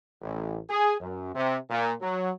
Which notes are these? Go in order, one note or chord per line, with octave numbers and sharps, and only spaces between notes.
A1
G#4
F#2
C3
A#2
F#3